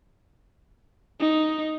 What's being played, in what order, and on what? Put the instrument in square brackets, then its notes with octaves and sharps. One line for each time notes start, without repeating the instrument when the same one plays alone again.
[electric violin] D#4